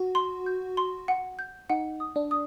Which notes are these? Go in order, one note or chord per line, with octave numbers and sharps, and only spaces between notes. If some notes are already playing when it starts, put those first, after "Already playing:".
Already playing: F#4
C6
G6
C6
F#5
G6
D#4 F#5
D#6
D4
D#6